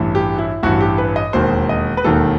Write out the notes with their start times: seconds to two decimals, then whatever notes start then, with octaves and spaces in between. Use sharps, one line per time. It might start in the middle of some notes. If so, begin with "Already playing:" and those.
Already playing: A1 G2 E3
0.15 G4
0.38 E4
0.63 A1 G2 E3 F#4
0.81 G4
0.98 B4
1.16 D#5
1.33 E1 D#2 D#3 C5
1.69 D#5
1.97 B4
2.04 E1 D#2 D#3 A4